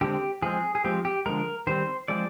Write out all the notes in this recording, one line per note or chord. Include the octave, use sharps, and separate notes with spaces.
D3 G#3 C4 G4
F3 G#3 C4 G#4
G#4
F3 G#3 C4 G4
G4
D3 F3 G#3 A#4
D#3 G3 C4 C5
F3 G#3 C4 D5